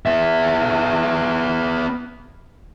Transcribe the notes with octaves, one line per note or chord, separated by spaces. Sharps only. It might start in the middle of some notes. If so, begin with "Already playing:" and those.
B3 E5